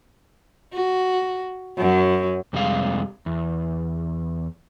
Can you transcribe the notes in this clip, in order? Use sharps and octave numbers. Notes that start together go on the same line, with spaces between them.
F#4
F#2 F#3
F2 C3 G3 G#3 F5
E2